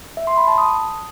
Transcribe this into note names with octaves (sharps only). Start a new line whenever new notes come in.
E5
C6
B5
A5
D#6